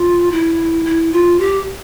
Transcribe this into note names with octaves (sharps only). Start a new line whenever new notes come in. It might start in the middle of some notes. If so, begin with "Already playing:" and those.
Already playing: F4
E4
E4
F4
G4